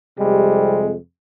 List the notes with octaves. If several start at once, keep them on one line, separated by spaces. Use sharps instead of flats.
F2 C3 G3 G#3